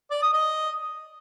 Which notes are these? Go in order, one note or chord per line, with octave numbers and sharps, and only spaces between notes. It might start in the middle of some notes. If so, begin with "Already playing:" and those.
D5
D#6
D#5